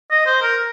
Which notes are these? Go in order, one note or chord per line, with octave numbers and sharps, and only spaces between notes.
D#5
C5
A#4